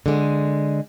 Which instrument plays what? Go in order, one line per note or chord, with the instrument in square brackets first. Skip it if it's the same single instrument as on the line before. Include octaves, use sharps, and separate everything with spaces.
[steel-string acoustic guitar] D3 G#3